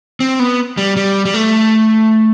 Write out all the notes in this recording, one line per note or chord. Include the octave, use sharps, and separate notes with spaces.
C4
B3
G3
G3
G3
A3